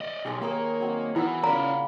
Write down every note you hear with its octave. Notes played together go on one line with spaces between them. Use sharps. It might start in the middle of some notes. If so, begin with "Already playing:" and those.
D5 D#5
B1 G4 G#4 C6
D#3 A#3 G#4 A#4 C#5 G5
F#3 C4
E3 B3 E4 E6
A#2 C#3 C#4 D5 F5 A#5 B5